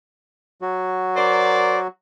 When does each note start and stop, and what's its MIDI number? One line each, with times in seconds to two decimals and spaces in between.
0.62 1.87 54
0.62 1.87 66
1.17 1.78 70
1.17 1.78 72
1.17 1.78 74